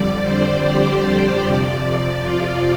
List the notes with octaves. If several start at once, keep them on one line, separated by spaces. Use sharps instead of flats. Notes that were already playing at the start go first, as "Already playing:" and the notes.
Already playing: F2 D3 G3 D5
C5
G4
C5
F2 C3 F3 D5
F4